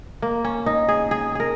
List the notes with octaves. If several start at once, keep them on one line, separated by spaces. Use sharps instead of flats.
A#3
C#4
D#4
G#4
G#4
G#4 A#4